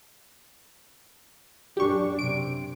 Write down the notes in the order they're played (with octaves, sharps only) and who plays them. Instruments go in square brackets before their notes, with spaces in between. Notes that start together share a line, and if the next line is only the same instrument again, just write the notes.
[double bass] F#2 D4 [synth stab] G4 C#6
[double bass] C3 [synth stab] D7